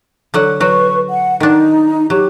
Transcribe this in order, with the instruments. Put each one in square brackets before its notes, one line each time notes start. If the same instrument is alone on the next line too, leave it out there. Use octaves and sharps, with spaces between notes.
[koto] D3 F#3 F#5
[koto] F#3 F#4 [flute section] B4 C#6
[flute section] F#5
[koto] D#3 D4 [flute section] D#4
[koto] F#3 [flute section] G4